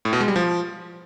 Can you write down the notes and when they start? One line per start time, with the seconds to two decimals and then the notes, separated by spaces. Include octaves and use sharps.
0.05 A2
0.13 B2
0.20 G#3
0.28 G3
0.36 F3